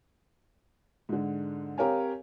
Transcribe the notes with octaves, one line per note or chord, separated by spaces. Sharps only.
G#2 D3
C4 G4 A#4 C#5 F5 G#5